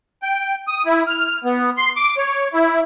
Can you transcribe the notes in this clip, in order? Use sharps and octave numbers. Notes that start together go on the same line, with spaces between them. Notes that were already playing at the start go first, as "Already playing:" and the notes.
G5
D#6
E4
F6
B3
C6
D6
C#5
E4